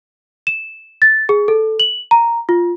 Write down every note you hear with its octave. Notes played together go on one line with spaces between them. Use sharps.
E7
A6
G#4
A4
F#7
A#5
F4